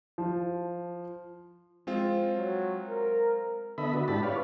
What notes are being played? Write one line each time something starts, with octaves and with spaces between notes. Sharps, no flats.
F3
F3 G#3 C4 F4
F#3
A#4
D3 B3 A4 D#5 E5 B5
D4 F#4
G#2 D4 E4 G4 A5 B5
B4 C#5 D5 F5